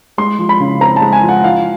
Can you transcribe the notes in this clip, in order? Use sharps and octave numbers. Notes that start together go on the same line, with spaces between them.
G#3 C6
F3
B5
C#3
C4 A#5
A5
G#3
G#5
F3
F#5
F3 F5